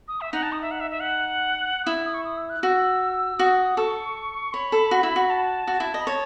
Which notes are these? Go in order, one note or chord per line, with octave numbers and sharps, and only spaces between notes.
D#6
E5
D#4 F#5
A5
D#6
E5
F#5
E5
E5
F#5
E4 D#6
D#6
C#6
D#6
E6
F#6
F#4 E6
F#4 D#6
A4 C#6
C#5 B5
A4
F#4
E4
F#4
A5
F#4
E4
D#5
B5
C#5 A5